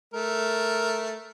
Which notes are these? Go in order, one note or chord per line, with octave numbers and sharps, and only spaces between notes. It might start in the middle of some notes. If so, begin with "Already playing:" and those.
A3 A#4